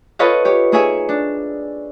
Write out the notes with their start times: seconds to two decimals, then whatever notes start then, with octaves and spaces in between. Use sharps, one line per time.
0.19 F4 A4 B4 C#5 D#5 F5
0.45 G4 C#5
0.72 A#3 D#4 G#4 C#5 E5 G#5
1.09 D4